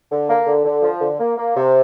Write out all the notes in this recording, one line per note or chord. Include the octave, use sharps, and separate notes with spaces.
D3
A#3
D3
D3
F3
D3
A#3
A#3
C3